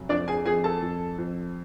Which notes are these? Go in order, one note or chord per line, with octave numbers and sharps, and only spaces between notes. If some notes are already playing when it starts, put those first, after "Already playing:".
Already playing: F1 F#3
F2 D4 D5
G#4 G#5
F2 G#4 G#5
A4 A5
F2
F2